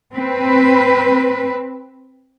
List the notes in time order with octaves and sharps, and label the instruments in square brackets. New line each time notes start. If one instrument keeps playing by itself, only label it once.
[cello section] C4 B4